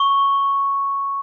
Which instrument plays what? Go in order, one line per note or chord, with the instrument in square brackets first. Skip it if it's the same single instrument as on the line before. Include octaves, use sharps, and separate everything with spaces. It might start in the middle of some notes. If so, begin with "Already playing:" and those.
Already playing: [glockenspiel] C#6